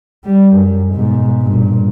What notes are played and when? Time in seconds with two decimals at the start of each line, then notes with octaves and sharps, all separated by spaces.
0.25 G3
0.55 F#2
0.94 G#2 B2
1.41 G2 A#2